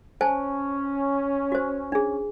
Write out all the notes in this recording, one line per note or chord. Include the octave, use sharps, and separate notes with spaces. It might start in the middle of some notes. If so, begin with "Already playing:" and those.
C#4 C5 G#5 A5
F#4 C5
D4 G#4